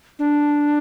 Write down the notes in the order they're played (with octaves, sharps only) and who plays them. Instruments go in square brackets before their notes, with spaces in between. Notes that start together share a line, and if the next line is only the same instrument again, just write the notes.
[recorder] D4